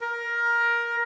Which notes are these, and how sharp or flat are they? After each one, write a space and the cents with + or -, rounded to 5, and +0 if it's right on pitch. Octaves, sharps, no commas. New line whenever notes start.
A#4 +15